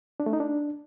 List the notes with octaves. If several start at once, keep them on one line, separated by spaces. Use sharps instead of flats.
D4
A3
D#4
D4